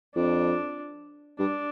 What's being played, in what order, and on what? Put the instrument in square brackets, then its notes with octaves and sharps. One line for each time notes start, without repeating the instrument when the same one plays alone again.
[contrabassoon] F2 [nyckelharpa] D4
[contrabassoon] G2 [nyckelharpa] D4